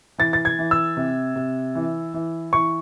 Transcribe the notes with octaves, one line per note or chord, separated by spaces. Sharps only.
E3 A6
A6
G#6
E3
E6
C3
C3
E3
E3
E3 C#6